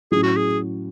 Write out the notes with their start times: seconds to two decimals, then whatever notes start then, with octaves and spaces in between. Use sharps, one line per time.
0.11 A2 F#3 C#4 G#4
0.23 F#4
0.36 G#4